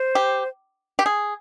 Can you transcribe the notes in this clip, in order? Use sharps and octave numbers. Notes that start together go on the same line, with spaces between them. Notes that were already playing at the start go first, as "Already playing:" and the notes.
Already playing: C5
G4
G4
G#4